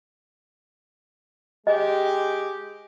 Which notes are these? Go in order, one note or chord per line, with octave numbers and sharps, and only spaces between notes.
G#3 G4 D#5